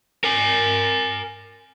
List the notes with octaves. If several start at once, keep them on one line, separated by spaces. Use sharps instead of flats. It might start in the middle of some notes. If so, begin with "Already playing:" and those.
A#4 G#5